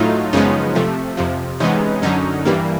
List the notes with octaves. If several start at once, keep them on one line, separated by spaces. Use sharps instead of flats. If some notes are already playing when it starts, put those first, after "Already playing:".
Already playing: A2 F#3 A3 D#4 F4
F#2 C#3 F3 G#3 B3 C#4 D#4
C3 F3 A3
F2 C3 F3
C3 E3 G#3 B3 C#4 D#4
F#2 D3 F#3 C#4 D#4
G2 E3 G3 A#3